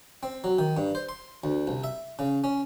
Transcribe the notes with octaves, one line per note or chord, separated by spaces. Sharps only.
C4
F#3
D#3
G2
C5
C6
D2
C2
E5
C#3
C#4